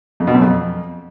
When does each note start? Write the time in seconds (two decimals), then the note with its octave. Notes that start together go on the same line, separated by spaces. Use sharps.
0.20 F2
0.27 B2
0.34 F#2
0.42 F2